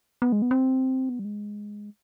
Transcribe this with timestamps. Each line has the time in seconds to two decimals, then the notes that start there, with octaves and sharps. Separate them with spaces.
0.22 B3
0.32 G#3
0.42 B3
0.51 C4
1.09 B3
1.19 G3
1.25 G#3